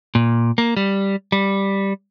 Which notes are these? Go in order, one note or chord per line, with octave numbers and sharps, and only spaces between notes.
A#2
A#3
G3
G3